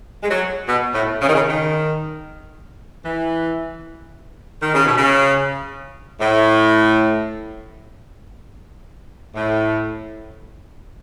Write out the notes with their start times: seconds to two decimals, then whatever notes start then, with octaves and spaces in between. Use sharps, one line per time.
0.22 G#3
0.29 F#3
0.67 B2
0.93 A2
1.21 C#3
1.28 D#3
1.34 C#3
1.46 D#3
3.04 E3
4.61 D#3
4.74 C#3
4.85 B2
4.97 C#3
6.19 A2
9.34 A2